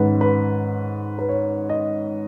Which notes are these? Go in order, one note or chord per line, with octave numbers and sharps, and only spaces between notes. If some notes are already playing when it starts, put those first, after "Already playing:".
Already playing: G#2 D#3 G#3 C#4 B4 F#5
B4
B4
C#5
D#5